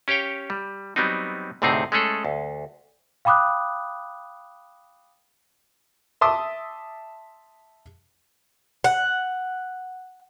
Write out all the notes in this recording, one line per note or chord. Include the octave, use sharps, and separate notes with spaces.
C#4 G4 C#5 F5 G5
G3
F#3 G3 B3 C4 D#4
D2 A2 C3 C4 D#4 G#4
G#3 A3 C#4 G#4 A4
D2
F5 G5 B5 D6 D#6 F#6
E5 A5 C6 D6 D#6
F#5